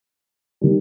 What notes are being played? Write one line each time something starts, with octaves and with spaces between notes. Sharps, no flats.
D#3 G3